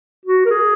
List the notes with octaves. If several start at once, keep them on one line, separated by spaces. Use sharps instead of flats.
F#4
A#4
G#4